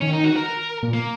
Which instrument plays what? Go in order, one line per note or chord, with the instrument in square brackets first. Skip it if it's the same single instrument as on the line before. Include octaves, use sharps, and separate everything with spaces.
[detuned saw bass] D#3 [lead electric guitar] C#4
[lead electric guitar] D#4
F#4
A#4
[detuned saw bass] A#2
[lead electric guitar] A#3